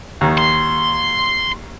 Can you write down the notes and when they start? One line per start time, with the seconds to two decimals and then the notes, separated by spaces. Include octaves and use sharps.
0.21 D#2 D#3
0.38 C6